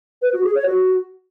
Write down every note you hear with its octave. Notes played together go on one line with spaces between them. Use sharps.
B4
F#4
G#4
C#5
F#4